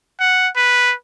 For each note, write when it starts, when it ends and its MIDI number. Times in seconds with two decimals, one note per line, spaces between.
0.20 0.48 78
0.56 0.94 71